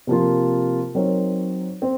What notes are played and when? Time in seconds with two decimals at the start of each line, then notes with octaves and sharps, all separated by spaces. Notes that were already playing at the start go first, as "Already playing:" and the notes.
0.07 C3 F3 A#3 F4
0.95 F#3 C4 D#4 A#4 C#5
1.82 C4